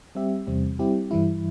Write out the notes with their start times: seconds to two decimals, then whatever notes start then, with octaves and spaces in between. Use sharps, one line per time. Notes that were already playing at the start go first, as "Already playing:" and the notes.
0.15 G3 C4 G4 E5
0.47 E2 C3 G3 C4
0.79 G3 C4 E4 G4
1.11 G2 E3 G3 E4